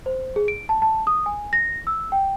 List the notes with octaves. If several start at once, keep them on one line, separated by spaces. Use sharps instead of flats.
C5
G#4
D7
A5
A5
D#6
G#5
A#6
E6
G5